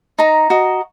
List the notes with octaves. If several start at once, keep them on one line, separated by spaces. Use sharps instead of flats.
D#4 A#5
F#4 D#5